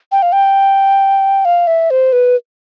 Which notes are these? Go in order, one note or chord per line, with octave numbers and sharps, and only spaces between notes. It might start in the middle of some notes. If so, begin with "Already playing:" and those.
G5
F5
G5
F5
E5
C5
B4